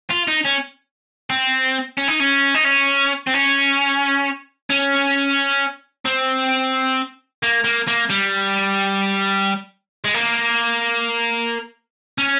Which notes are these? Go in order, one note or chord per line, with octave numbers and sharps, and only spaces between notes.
F4
D#4
C#4
C4
C#4
D#4
C#4
D#4
C#4
C4
C#4
C#4
C4
A#3
A#3
A#3
G3
G#3
A#3
C#4